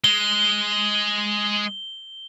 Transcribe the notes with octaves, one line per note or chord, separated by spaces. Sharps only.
G#3 G7